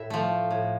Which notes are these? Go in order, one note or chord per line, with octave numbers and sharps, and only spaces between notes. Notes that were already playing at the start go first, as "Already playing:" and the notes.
Already playing: A2 E5
F3 A3
A2